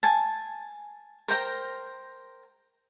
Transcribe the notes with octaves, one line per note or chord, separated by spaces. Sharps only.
G#5 A5
A#4 C5 G5 A#5